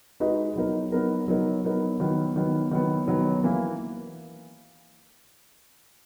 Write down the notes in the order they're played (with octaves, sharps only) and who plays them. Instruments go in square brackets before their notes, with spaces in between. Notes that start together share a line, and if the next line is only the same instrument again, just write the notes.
[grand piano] G#3 D#4 F#4 B4 D#5
F#3 B3 D#4 A#4
F#3 B3 D#4 A#4
F#3 B3 D#4 A#4
F#3 B3 D#4 A#4
D#3 F#3 B3
D#3 F#3 B3
D#3 F#3 B3
D#3 F#3 B3
E3 A#3 E4